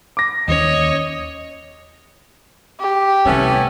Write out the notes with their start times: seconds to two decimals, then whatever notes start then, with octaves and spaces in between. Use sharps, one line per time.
0.17 D6 A#6
0.48 D#2 G3 C#4 C#5 D#5
2.81 G4
3.25 C2 G3 A3 B3 C#4